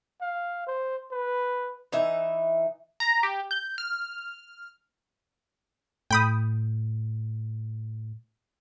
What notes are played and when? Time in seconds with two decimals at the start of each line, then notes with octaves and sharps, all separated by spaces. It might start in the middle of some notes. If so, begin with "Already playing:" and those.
0.21 F5
0.67 C5
1.12 B4
1.92 E3 D#4 E5
3.00 A#5
3.23 G4
3.51 G6
3.78 F6
6.11 A2 G5 B5 D#6